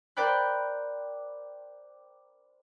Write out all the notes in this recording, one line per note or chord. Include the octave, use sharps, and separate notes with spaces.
A#4 C5 D5 G5 B5 F#6